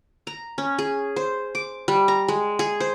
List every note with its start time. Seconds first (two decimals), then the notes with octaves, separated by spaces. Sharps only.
0.27 A#5
0.58 C#4
0.78 G#4
1.16 C5
1.55 D6
1.88 G3
2.08 A#5
2.28 G#3
2.59 G#4
2.80 C5